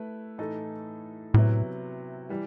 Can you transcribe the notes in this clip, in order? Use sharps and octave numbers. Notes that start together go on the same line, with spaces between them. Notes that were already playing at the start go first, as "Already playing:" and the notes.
Already playing: A3 E4 B4
A2 E3 A3 D#4 A4
A2 C3 F#3 B3 E4
E3 G3